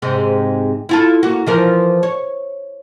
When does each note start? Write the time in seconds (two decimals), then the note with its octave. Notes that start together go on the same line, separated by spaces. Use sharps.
0.02 G#2 C3 G#3
0.89 E4 F4 A4
1.23 A#3 F#4
1.47 E3 F3 A#4
2.03 C#5